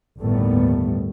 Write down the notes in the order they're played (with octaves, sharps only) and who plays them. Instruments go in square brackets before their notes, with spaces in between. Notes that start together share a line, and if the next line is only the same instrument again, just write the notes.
[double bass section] G1 D#2 A2 G3 A3 B3